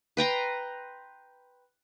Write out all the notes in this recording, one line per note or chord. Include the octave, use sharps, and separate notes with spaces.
B4 G5 A#5 C6